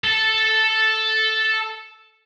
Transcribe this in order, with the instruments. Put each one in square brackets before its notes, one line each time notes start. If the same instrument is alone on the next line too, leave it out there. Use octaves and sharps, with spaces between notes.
[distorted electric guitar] A4 A5